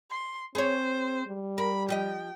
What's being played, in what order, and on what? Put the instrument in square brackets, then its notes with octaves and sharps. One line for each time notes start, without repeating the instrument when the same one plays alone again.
[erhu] C6
[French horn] C4 [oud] G#4 C#5 [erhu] C5
[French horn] G3
[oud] A#4 [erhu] B5
[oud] F3 G4 D#5 [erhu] G5